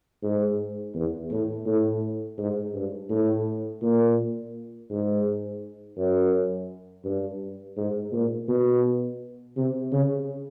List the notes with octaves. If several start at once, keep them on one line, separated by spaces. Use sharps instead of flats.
G#2
E2
A2
A2
G#2
G2
A2
A#2
G#2
F#2
G2
G#2
A#2
B2
C3
C#3